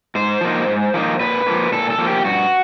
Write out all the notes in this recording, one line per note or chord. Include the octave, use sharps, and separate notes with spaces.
G#2 C5
F3 A#3 D#4
G#2
F3 A#3 D#4
A#2 B4
F3 A#3
A#2 A4
A4
F3 A#3
G4
G2 F#4